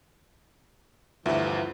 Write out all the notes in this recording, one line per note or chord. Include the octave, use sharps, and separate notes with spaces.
D2 G2 E3 F3 E4 F#5 A#5